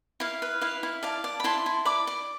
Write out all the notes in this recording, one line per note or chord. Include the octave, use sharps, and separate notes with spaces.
E4 F5
B4
E4 F5
E4
D5 F5 A5
D5
B5
E4 A5 C6
E4
D5 B5 D6
D5